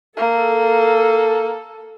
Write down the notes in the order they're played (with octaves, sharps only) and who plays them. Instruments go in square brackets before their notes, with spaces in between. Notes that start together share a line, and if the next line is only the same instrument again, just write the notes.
[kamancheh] A#3 [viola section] A4